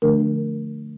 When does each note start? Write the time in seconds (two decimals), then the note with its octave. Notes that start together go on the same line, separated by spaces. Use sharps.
0.02 D3 F3 A3 D4 A#4